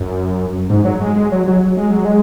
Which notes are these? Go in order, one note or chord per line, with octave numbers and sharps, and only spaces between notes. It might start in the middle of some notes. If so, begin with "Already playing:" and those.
Already playing: F#2
G#2
F#3
G#3
G#3
F#3
F#3
G#3
F#3
G#3